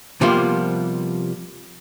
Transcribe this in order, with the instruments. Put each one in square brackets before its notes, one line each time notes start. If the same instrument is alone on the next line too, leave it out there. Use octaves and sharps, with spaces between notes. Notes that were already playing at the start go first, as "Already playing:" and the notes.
[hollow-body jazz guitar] C3 F3 G3 A#3 B3 F4